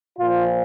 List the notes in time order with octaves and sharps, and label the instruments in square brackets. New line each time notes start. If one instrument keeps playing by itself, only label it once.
[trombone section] A#2 F3 F4